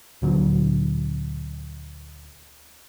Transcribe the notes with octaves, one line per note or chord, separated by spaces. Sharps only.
D2 A#2 D3 F#3